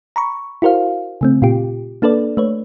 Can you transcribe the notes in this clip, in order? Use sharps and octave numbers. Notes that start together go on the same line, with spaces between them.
A#5 B5 C#6
E4 F#4 A#4 C5 F5
C#3 A3 C4
A#2 F4 G4
A#3 D4 A4 B4 D5
A3 B4 C#5